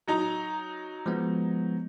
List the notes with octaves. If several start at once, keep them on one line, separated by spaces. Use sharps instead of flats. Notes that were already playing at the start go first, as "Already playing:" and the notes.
F#3 D#4 A#5
F3 G#3 B3